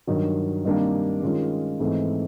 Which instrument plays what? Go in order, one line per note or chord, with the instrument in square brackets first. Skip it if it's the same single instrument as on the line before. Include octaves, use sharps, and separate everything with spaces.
[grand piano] G2 D#3 F#3
C3 D#3 G3 A#3 D4
D#3 G#3 C#4 F4
G#2 E3 A3 C4